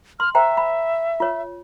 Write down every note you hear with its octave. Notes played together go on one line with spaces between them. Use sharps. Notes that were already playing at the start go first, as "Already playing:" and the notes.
C6 F6
C5 E5 G5 A#5
B5
F4 C#5